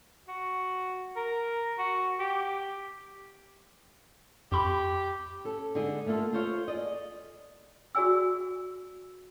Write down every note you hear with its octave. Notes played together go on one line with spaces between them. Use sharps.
F#4
A#4
F#4
G4
F2 G4 B5 C6
C#4 A4
D3 G#3 D#4 G#4
A3 A#3 D4 F4 A4
F4 A4 C5 C#5 F5
G#4 D5 D#5
F#4 G#4 D5 G#5 E6